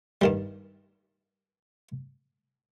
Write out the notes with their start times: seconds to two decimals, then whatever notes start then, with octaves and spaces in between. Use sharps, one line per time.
0.21 G2 D#3 G3